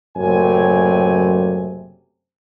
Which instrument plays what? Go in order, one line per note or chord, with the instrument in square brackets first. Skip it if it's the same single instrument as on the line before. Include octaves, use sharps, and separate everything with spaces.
[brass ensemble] F#1 F#2 A2 C3 G#5